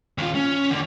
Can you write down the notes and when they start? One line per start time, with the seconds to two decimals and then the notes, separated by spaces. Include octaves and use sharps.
0.18 D#2 F4
0.35 C#4
0.70 E2 D3